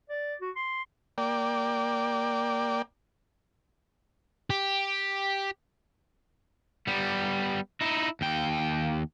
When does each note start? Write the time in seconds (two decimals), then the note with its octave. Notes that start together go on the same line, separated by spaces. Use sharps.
0.10 D5
0.41 F#4
0.56 C6
1.18 A#3 D5 G5
4.50 G4
6.87 G3 B3
7.81 D#4 E4
8.21 D#2 G5